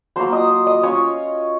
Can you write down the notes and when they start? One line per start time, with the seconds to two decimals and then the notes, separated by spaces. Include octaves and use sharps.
0.16 F#3 A#3 F4 C5 C6
0.32 D#5 D#6
0.67 D#5 D#6
0.83 C#4 F4 C#5 C#6